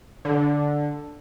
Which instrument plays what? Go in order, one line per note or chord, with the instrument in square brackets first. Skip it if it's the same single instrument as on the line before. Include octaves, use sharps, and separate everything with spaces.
[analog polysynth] D3